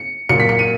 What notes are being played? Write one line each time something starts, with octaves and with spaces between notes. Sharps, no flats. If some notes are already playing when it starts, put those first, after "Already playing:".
Already playing: C#7
A#2 F#3 A#3 C#7
B6
C#7
D#7